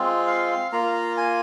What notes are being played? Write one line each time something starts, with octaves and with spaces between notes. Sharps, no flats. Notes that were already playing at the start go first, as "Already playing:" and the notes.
Already playing: G#3 C4 F4
F5
A#3 F4 A#5
G#5